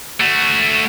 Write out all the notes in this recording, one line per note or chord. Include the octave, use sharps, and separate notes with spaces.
A3 F#4